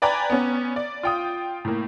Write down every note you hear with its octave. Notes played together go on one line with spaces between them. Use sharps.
B4 D5 G5 G#5 A#5 B5
B3 C#4
D5
F4 G5 D#6
A2 A#3